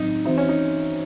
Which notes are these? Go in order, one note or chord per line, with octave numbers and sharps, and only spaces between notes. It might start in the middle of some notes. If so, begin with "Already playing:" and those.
Already playing: A2 F#3 C4 D#4
E3 C4 D#4 F#4 C5 E5
C#4
D#4